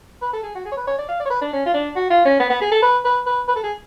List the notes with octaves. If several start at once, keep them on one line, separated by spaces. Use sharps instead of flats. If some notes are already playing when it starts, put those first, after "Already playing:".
B4
A4
G#4
F#4
G#4
C#5
B4
C#5
D5
F5
D5
C#5
B4
D4
C#4
F4
D4
F#4
F4
C#4
B3
B3
G#4
A4
B4
B4
B4
B4
A4
G#4